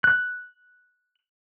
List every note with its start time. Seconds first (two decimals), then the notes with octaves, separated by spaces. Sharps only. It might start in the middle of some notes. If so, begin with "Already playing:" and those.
0.04 F#6